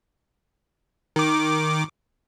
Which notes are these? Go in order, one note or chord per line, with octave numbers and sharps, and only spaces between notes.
D#3 D6